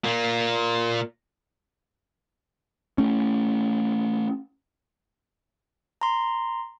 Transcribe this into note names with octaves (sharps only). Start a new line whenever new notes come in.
A#2 A#3
A3 C#4
A#5 C6